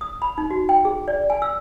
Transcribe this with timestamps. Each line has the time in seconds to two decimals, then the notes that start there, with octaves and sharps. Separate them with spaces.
0.01 D#6
0.22 B5
0.38 D#4
0.51 F#4
0.69 G5
0.85 G#4
1.08 D5
1.30 G#5
1.42 E6